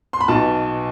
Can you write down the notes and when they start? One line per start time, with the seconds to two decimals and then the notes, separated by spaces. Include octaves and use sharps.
0.13 C6
0.21 B5
0.28 B1 B2 A5